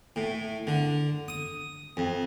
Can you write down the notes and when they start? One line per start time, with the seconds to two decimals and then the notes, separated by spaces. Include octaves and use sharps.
0.16 A2
0.67 D3
1.28 D#6
1.97 F2